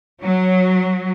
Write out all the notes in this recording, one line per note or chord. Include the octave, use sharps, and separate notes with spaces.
F#3